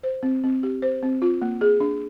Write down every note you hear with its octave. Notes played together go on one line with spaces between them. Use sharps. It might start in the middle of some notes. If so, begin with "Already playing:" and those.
C5
C4
C4
G4
C5
C4
F4
A#3
G#4
D4